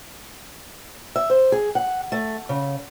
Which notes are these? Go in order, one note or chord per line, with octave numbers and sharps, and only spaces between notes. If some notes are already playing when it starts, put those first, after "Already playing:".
E5
C5
G#4
F#5
A3
C#3